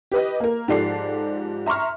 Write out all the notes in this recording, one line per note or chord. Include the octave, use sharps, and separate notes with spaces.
G4 B4 D#5
A#3 A#4
G#2 F3 G4 A4 D5 C7
E5 A#5 C6 C#6 F6